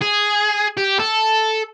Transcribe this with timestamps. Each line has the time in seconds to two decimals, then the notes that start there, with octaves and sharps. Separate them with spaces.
0.01 G#4
0.77 G4
0.99 A4